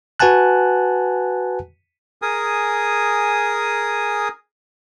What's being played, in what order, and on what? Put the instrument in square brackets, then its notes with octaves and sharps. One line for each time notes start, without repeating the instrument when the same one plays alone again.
[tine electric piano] F#4 B4 F#5 G#5 A5 F#6
[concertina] G#4 A#4 G#5 D#6